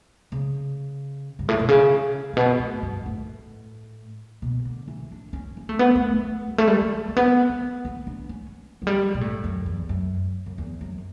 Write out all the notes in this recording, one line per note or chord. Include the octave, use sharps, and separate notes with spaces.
C#3
G2
A2
B2
C#3
A2
B2
A2
G2
A2
B2
D3
E3
D4
C#4
C#4
A3
B3
A3
A3
G3
A3
G3
A3
A3
B3
B3
B3
D4
C#4
F#3
G3
B2
A2
F#2
E2
F#2
F#2
E2
F#2